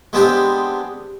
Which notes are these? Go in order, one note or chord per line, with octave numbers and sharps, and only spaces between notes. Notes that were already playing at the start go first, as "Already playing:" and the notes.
G#3 B3 C4 D4 G4